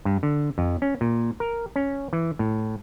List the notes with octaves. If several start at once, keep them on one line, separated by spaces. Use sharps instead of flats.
G2
D3
F2
C#4
A#2
A#4
C#4
E3
A2